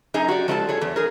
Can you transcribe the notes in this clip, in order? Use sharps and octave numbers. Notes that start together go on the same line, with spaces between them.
F#2 D#4 G#4 D#5 G#5 A#5
F#4 G4 D5
F3 G#3 F4 A4 F#5 A5
F#3 G#4 C#5
E2
G#4 A#4